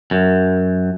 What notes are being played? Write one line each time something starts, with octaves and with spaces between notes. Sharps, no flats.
F#2